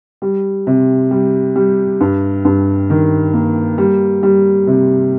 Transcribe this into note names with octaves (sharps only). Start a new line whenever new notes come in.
G3
C3
G3
G3
G2
G2
D#3
A#3
G3
G3
C3